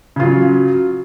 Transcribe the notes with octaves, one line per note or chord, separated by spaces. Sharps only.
C#3 F#3 F4